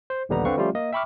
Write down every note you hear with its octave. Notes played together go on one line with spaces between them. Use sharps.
C5
A#1 D#2 D3 G3 B3 A#5
D3 C4 B4 F5 C#6
F3 G3 A3 C#4 F4 G4
A#3 D#5
E5 G5 B5 C#6 D6 F6